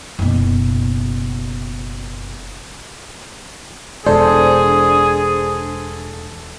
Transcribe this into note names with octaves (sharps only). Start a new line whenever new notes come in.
F#1 B2
E1 D4 G#4 A4 C5